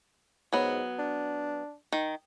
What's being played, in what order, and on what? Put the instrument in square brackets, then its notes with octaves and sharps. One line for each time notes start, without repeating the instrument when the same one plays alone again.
[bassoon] G#2 [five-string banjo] F#3 B3
[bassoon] D4
[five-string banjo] D#3